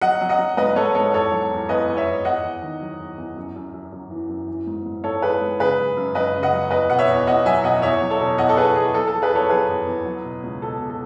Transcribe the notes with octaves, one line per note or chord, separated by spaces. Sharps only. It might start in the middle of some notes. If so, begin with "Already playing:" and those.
F#3 D#5 F#5
F#3
D#5 F#5
F#3
G#2 B4 D#5
G#2 A4 C#5
G#2 A4 C#5
E2 A4 C#5
F#3
E2
E2 B4 D#5
E2
C#5 E5
E2
E2 D#5 F#5
E2
D#3
F#3
E2
E2
F#2
F#2
F#2
F#2
E3
F#2
E3
G#2
G#2
G#2 A4 C#5
E3 G#4 B4
G#2
C#3 G#4 B4
F#2
F#2
F#2 B4 D#5
C#3
D#5 F#5
F#3
E2 B4 D#5
B2 F#5
C#5 E5
E2
E2 D#5 F#5
F#3 E5 G#5
B2 D#5 F#5
E2 C#5 E5
F#3
A4 C#5
B2
E2 D#5 F#5
A4
E2 G#4 B4
E2 G#4
F#3 A4
A4
F#3
G#4 B4
E2 A4 C#5
F#3 G#4 B4
E2
E2
F#3
B2
C#2
B2 A4
B2
A4